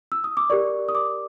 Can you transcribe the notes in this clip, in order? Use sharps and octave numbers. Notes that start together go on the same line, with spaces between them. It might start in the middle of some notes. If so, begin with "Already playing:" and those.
E6
D#6
D6
G4 A#4 D5 C#6
D#6
D6